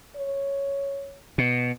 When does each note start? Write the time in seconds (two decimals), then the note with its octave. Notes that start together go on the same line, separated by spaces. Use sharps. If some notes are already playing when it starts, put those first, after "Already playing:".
0.16 C#5
1.38 B2